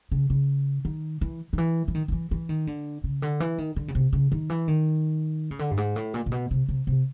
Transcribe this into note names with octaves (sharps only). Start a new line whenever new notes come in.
C#3
C#3
D#3
E3
D#3
E3
E3
D#3
D#3
E3
E3
D#3
D3
C#3
D3
E3
D#3
D3
C#3
C3
C#3
D#3
E3
D#3
C#3
D3
G2
G#2
A2
A#2
A#2
B2
C3
C3
C3